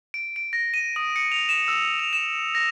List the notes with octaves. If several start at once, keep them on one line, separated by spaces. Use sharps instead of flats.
D7
D7
A#6
D#7
D#6
C#7
F7
E7
E6
F7
E7
A#6